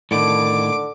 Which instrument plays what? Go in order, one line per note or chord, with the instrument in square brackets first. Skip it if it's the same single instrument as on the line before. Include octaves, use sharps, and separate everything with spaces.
[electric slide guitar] A2 D#3 [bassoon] D3 [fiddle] D6